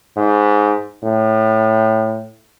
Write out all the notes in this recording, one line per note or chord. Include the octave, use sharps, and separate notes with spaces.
G#2
A2